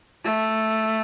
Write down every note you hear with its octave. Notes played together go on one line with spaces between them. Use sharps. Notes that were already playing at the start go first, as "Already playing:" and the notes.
A3